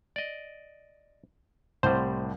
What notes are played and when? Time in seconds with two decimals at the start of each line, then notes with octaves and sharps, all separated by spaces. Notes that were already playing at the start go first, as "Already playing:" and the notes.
0.16 D5 D#5
1.83 C2 A2 G3 C5